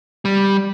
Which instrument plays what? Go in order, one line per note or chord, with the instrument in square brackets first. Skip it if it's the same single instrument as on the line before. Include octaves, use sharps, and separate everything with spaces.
[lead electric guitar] G3